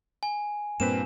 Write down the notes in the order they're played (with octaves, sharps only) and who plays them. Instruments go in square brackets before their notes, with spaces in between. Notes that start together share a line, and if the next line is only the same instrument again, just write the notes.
[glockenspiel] G#5
[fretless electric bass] G2 A#2 [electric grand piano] A#3 C4 B4 [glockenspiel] E7